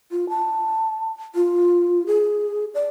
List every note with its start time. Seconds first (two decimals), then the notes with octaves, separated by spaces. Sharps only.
0.11 F4
0.29 A5
1.35 F4
2.07 G#4
2.75 D5